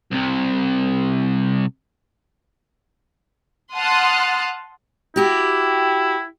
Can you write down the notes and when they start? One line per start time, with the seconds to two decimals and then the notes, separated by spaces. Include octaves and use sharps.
0.12 C2 C3
3.75 F#5 A5 C6 D#6 F6 F#6
5.16 E4 F#4 G4